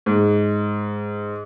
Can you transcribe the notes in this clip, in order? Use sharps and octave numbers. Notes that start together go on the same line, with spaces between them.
G#2